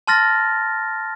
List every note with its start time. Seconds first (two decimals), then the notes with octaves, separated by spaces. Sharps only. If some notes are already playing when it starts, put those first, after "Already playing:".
0.07 A5 C6 F6 A6 A#6